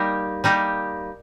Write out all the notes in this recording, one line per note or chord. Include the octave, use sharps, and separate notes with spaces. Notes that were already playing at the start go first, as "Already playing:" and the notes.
Already playing: G3 A#3 D#4 G4 A#4
G3 A#3 D#4 G4